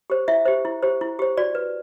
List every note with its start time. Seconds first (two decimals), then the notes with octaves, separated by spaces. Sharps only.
0.10 G4 C5
0.28 E4 E5
0.46 G4 C5
0.65 E4
0.83 G4 C5
1.01 E4
1.19 G4 C5
1.37 F#4 D5
1.55 B4